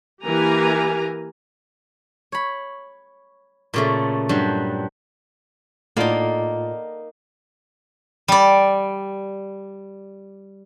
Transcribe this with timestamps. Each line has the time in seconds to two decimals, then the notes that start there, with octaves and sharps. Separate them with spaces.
0.24 E3 A#3 G4 A#4 G#5 A#5
2.32 C#5 B5
3.74 A#2 C#3 A3
4.29 G2 F#3 G3
5.97 A2 A#3 B3 D#4 F4 A4 D5
8.28 G3 D5